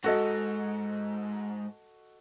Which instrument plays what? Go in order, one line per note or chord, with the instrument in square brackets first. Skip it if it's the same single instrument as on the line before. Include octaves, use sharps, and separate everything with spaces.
[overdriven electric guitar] G#2 [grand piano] F#4 A4 D#5